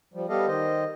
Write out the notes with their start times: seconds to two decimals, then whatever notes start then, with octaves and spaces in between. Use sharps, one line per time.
0.14 F3 G3
0.29 G3 B3 G4 A4 D#5 F5
0.47 D#3 C5 D#5